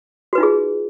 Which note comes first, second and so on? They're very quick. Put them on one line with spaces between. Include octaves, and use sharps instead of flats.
F#4 B4 D#4 F4 G#4